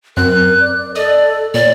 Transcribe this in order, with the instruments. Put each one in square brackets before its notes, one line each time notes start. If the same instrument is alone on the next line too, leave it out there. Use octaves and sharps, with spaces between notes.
[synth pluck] F#2 C4 [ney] A#4 [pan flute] F#6
[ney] D5
[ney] A4 [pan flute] D5 [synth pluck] D#5
[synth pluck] A#2 [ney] C#5 [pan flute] D5